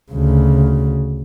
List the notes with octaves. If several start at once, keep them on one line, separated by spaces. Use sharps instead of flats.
D2 C#3